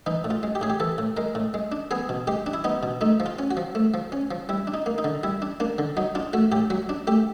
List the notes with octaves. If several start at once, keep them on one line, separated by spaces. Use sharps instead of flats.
E3 D#4
A2
F4
G#3
G4
A2 G#4
G4
E3 A4
A2
G#3 A#4
A2
G#3
D4
B3 G#4
B2
G#3 G4
D4
E4
B3 D#4
B2
A3 D#4
F3
F4
C#4
F#4
F3
A3
F3
C#4
F3
G3 E4
D4
D#4
A#3
D#4
D3
G3 E4
D4
A#3 D4
D3
F#3 D#4
D4 F4
A3 F#4
A2 G4
F#3 F#4
D4
A3 G4